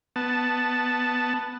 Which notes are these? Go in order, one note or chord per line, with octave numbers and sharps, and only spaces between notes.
B3 A5